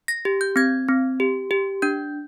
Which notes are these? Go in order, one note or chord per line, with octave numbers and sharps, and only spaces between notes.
A#6
G4
G6
C4 G#6
C4
G4
G4
D4 G6